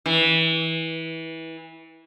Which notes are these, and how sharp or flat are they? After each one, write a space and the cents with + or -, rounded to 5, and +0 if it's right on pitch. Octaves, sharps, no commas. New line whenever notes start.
E3 -20